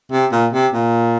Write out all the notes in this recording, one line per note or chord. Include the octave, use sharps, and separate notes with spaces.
C3
A#2
C3
A#2